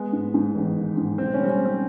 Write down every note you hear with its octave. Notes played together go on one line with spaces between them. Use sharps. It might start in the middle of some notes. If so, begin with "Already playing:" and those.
Already playing: G#3 B3
G#2
G#2
A1
D#3
G#2
B1 C4
C#4
G3 C4
C#4
G3 C4